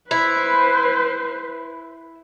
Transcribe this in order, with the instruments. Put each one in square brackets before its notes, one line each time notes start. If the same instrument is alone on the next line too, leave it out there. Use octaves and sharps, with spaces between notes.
[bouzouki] E4 [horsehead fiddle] B4 C5